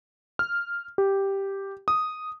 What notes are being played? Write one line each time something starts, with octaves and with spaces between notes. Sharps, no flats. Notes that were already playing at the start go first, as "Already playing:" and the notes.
F6
G4
D#6